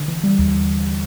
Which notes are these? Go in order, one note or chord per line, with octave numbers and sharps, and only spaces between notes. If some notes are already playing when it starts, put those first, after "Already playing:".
Already playing: D3
E3
G3
D#2